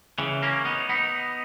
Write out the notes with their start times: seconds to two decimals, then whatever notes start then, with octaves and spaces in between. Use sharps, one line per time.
0.18 C#3 E3
0.42 A#3 C#4
0.65 B3 D#4
0.89 B3 D#4